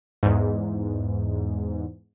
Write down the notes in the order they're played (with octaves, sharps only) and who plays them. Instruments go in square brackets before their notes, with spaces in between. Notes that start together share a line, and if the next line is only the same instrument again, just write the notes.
[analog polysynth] E2 G#2